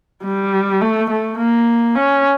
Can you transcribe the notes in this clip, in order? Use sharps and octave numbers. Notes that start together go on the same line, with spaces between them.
G3
A3
A3
A#3
C#4